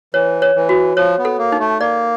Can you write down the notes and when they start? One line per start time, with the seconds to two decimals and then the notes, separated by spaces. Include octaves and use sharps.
0.14 E3 C#5
0.42 C#5
0.56 E3
0.69 F#4
0.97 F3 C#5
1.18 B3
1.25 A4
1.38 A#3
1.52 D#4
1.59 A3
1.80 A#3 D5